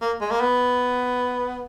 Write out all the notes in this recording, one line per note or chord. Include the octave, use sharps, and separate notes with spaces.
A#3
G#3
A#3
B3